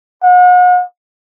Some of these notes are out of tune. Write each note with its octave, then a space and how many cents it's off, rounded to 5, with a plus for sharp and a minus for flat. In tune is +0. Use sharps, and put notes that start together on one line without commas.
F#5 -40